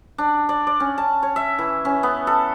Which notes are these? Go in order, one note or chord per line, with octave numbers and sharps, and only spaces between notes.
D4
D5
D5
C#4
A5
C#5
E5
E3
C#4
B3
A4